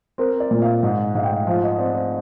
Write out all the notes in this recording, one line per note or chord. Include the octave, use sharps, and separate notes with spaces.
C4 A#4
D5
A#2
F5
G#2
G#2 F5
G5
F5
F3 F5
D#5
C4 D5
C5